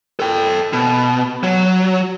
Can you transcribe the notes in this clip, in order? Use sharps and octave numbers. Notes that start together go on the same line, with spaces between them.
A4 G5
B2
F#3